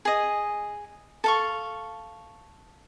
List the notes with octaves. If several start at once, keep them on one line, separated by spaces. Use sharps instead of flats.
G#4 D#5
A4 F5 C#6